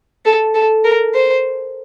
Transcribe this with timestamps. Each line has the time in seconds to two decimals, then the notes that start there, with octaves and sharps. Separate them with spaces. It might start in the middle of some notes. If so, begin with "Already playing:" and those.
0.25 A4
0.55 A4
0.85 A#4
1.15 C5